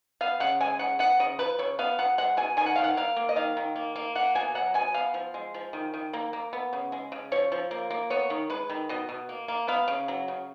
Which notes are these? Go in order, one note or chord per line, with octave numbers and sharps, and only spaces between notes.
B3 F5
C#3 F#5
G#3 G#5
C#3 F#5
B3 F#5
C#3 D#5
F3 B4
C#3 C#5
B3 F5
B2 F#5
G#3 F#5
B2 G#5
D#3 G#5
F#5
D#3 F5
F#5
A#3 F5
A#3
D#5
D#3 F5
D#3
A#3
A#3
A#3 F#5
B2 G#5
F#3 F#5
B2 G#5
B3 F5
F3
G#3
F3
D#3
D#3
A#3
A#3
B3
C#3
G#3
C#3
F3 C#5
F3
A#3
A#3
B3 C#5
D#3
G#3 B4
D#3
B2 D#5
B2
A#3
A#3
B3 F5
C#3
F#3
C#3